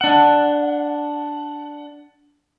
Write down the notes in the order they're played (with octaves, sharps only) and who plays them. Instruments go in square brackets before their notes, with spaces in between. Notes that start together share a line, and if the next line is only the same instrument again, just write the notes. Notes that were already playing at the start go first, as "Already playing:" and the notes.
[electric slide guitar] D4 F#5